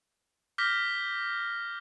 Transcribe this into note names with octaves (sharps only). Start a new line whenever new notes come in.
D6 F6 G6 A#6 B6 G7